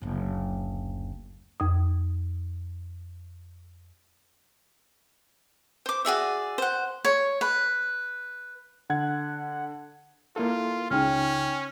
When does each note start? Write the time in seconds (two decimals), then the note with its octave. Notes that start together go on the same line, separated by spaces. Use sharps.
0.02 F#1 D2
1.60 F2 D#6
5.86 C5 D6
6.05 F#4 G#4 D5 E5
6.58 C5 F#5
7.05 C#5
7.41 B4
8.90 D3 F#5 G#6
10.36 A#3 E4 F4 A4
10.91 C#2 C#3 C#4 D#4 G5 F6